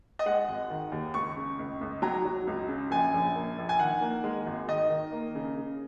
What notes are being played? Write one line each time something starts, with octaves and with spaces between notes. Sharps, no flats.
D#5
G#3 F#5
G#1
D#3
D#2
C#2 C#6
C#3
C#2
C#2
F#3 A#5
F#3
C#2
C#3
A#1 G#5
A#1
A#3
A#1
G#5
D#3 F#5
A#3
G#3
G#1
D#3 D#5
D#3
A#3
C#3
C#3